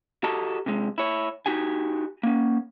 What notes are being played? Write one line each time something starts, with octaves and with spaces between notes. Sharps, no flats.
F#4 G4 A4 D#5 A5 A#5
C3 G#3
E4 C#5
D#4 F#4 G4 G#5
A#3 C#4